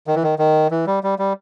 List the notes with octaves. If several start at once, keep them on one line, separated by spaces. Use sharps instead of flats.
D#3
E3
D#3
D#3
E3
G3
G3
G3